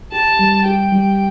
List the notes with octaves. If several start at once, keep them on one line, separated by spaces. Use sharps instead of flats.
G4 A5
G3
G4 G5
G3